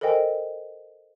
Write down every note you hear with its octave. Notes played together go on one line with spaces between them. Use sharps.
A4 A#4 C5 D#5 G5 G#5